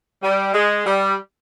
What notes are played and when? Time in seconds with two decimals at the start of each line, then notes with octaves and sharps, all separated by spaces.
0.23 G3
0.54 G#3
0.86 G3